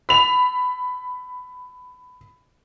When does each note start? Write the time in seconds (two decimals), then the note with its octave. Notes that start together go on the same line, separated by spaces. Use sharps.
0.09 B5 F7